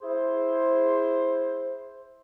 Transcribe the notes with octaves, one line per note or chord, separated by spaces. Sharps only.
E4 G#4 C5